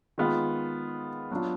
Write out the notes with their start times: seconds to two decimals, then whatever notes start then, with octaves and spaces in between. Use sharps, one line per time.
0.18 D#3 G#3 B3 F4
1.31 F#3 B3 D4 F4